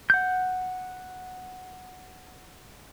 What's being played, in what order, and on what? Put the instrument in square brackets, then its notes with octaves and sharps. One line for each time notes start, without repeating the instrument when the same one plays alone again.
[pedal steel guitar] F#5 G6